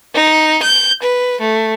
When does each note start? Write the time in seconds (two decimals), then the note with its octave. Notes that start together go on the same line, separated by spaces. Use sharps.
0.15 D#4
0.63 G6
1.03 B4
1.41 A3